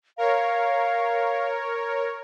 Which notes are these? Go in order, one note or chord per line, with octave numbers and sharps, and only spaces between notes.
A#4 C#5 F5